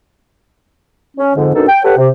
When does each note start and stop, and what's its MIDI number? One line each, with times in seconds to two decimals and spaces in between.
1.17 1.32 61
1.35 1.51 41
1.35 1.51 44
1.35 1.51 50
1.53 1.67 42
1.53 1.67 47
1.53 1.67 62
1.53 1.67 63
1.53 1.67 69
1.68 1.81 79
1.83 1.94 67
1.83 1.94 69
1.83 1.94 71
1.83 1.94 73
1.83 1.94 78
1.97 2.08 48